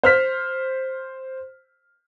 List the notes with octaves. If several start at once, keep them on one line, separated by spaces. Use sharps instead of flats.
C5 F6 B6